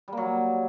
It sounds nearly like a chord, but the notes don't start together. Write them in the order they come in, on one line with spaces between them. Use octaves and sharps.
G3 A#3 F#3